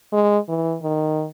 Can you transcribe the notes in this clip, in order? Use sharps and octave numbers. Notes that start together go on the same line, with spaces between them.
G#3
E3
D#3